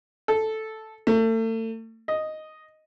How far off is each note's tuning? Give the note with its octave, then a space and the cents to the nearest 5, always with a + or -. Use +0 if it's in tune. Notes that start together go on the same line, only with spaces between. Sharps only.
A4 -5
A3 +35
D#5 +0